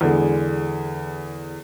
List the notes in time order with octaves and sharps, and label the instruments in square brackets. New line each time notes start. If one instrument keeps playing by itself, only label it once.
[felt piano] E2 D3 G#3